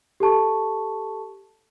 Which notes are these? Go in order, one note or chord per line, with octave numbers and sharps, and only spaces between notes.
G4 A4 A5 C#6